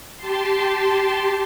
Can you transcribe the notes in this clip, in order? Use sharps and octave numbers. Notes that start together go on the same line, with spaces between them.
G4 A5 C6